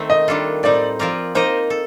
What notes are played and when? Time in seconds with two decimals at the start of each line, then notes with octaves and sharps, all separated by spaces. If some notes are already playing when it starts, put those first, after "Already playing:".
Already playing: D#3 A3 C4
0.10 D#5
0.28 D#3 G3 D4 F4 A4
0.63 A2 G3 C4 D#4 D5
0.99 F3 C4 F4 A#4 D5
1.35 A#3 D#4 A#4 C5 D#5
1.70 A4